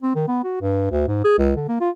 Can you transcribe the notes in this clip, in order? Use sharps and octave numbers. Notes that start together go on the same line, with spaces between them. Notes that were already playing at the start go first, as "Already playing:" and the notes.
C4
D#3
B3
F#4
G2
D2
G#2
G#4
C#2
D3
A#3
F4